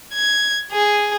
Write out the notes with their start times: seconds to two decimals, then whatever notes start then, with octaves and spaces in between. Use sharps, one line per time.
0.13 G#6
0.72 G#4